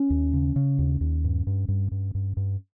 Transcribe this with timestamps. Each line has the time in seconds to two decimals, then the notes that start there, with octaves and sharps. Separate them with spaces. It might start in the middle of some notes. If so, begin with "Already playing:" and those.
Already playing: C#4
0.10 D#2
0.33 C#3
0.56 C#3
0.78 D#2
1.01 D#2
1.24 G2
1.47 G2
1.68 G2
1.91 G2
2.15 G2
2.37 G2